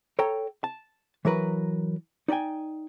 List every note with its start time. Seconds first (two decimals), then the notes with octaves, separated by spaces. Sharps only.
0.19 A4 C#5 G5 A#5
0.64 A5
1.25 E3 F#3 A#4 B4
2.28 D#4 D5 D#5 G5 G#5